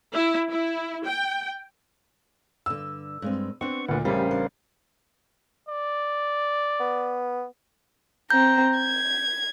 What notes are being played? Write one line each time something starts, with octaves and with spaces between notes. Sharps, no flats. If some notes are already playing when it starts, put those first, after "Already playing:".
E4
E4
G5
G2 D3 E6
G2 G#3 C4
B3 C4 D4 C#6
D2 A#2 B4 F#5
A1 C#3 G3 G4 G#4 A#4 C5 F5
D4
D5
B3
C4 A#5 G6
G#6